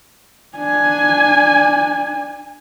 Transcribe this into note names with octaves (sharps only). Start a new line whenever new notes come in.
D4 G#5